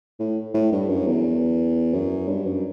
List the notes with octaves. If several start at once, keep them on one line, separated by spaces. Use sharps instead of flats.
A2
A2
G2
F#2
E2
F#2
G2
F#2